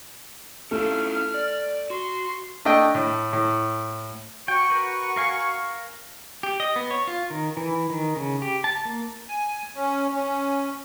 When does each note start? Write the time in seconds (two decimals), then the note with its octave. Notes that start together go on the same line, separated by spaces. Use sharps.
0.71 A3 C#4 E4 F4 F6
1.34 D5
1.90 F#4 C6
2.65 A3 D4 D#5 G5
2.95 A2
3.33 A2
4.48 F#4 G5 C#6
4.70 A#4 B4
5.16 A#4 F5 G#5
6.43 G4
6.60 D#5
6.76 B3
6.90 C#5
7.07 F4
7.30 D#3
7.57 E3
7.90 D#3
8.16 C#3
8.42 G4
8.64 A5
8.85 A#3
9.28 G#5
9.75 C#4
10.12 C#4